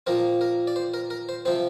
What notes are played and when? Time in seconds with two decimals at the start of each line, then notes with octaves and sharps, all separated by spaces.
0.07 A#2 F3 C4 A#4
0.41 A#4
0.67 D5
0.76 C5
0.94 A#4
1.10 A#4
1.29 C5
1.45 C3 F3 C4 C5